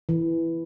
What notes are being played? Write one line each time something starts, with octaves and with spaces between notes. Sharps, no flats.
E3